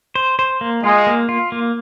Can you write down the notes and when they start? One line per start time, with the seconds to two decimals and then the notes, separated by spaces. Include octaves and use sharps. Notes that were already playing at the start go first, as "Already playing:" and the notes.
0.15 C5
0.39 C5
0.61 A#3
0.84 G#3 F4
1.07 A#3
1.29 F4
1.52 A#3